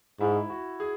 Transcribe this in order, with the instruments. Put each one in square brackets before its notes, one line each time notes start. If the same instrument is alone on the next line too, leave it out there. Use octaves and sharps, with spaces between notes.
[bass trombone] G#2 [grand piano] E4
[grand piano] F#4
G#4